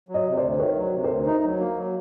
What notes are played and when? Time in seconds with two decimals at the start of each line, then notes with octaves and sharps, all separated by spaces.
0.09 F#3
0.14 C#5 D#5
0.27 C3
0.37 D2 C5 D5
0.59 D#3 B4 C#5
0.76 F#3
0.93 C3
1.04 A#4 C5
1.10 D2
1.26 D#4
1.44 F#3
1.60 A#3
1.76 F#3